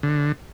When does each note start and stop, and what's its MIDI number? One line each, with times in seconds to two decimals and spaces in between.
0.03 0.32 50